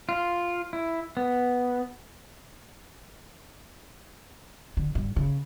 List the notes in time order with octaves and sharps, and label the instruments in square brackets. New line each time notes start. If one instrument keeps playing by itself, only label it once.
[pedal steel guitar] F4
E4
B3
[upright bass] D3
G2
C#3